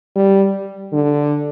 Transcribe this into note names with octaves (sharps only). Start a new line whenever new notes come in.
G3
D3